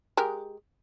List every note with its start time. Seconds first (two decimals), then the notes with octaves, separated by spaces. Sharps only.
0.17 G#3 G4 A#4